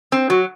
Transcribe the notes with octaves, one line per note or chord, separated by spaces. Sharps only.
C4
F#3 F#4